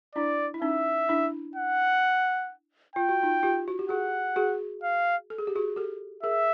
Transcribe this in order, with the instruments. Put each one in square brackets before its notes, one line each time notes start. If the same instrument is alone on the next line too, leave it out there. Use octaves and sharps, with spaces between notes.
[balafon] D4 E4 [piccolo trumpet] D5
[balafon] E4
[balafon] C#4 D#4 [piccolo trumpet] E5
[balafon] D4 E4
[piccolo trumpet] F#5
[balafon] F4 [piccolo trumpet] G5
[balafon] F#4
D#4 F4
F4 G4
F#4
G4
[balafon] F#4 G#4 [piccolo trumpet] F#5
[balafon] F#4 G#4
[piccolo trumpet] F5
[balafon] A4
G#4
G4
F#4 G#4
G4 A4
[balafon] G#4 A#4 [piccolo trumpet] E5